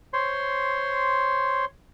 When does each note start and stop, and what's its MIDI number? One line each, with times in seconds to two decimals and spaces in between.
0.13 1.65 72
0.13 1.65 73
0.13 1.65 84